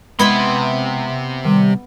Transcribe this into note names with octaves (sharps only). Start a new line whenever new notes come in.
C3 G#3 B3 E4 B5 C6
D#3 G3